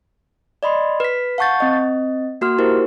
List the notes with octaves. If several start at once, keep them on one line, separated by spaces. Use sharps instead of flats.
D5 D#5 B5 C6
B4 B6
F5 F#5 A5 C#6 G6 A6
C4 D#5
A#3 F#4 C6 F6
D#4 E4 G4 A#4 C5